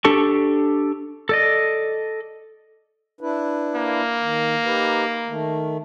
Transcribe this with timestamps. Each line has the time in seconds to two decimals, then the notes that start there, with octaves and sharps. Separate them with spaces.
0.05 D4 G4 A4 A5 C#6
1.29 A4 D5 D#5
3.21 D4 E4 B4
3.76 A#3
4.19 D#3
4.65 D#4 G4 B4
5.27 D#3 A3